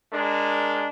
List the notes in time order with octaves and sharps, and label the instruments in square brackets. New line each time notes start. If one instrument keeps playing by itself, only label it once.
[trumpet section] G#3 D4 A#4